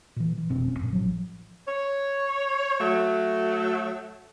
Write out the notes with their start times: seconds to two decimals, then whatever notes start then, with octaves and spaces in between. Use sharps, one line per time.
0.16 A#2 E3
0.38 E3
0.49 F1 B2 C4 D4
0.68 D1 C#4
0.79 F#1 A#2
0.93 A1 F3 F#3
1.68 C#5
2.80 F#3 A3